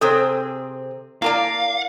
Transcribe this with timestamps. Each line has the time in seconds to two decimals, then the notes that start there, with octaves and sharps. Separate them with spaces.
0.01 C3 C4 G#4 A4 C5
1.22 A#3 E4 A#4 D5 F5 A5